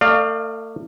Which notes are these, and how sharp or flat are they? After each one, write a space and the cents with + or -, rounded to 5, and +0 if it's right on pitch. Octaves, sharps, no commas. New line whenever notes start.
A3 +40 D5 +40 F5 +0